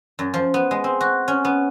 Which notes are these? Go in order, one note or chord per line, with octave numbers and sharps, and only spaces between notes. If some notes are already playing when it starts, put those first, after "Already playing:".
F#2
F3
B3
G#3
C4
F#4
C#4
B3